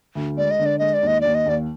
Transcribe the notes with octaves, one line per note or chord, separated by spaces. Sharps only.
D2
G#3 D5
D#5
D3
D5
G#3 D#5
D5
D#2 D#5
D#2 D5
D#5
D#2 D5